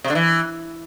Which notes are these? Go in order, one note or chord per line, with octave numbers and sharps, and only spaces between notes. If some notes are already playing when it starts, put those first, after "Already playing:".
C3
D3
E3